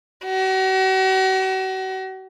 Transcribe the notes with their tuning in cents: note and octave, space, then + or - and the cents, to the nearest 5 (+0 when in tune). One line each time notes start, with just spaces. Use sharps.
F#4 +40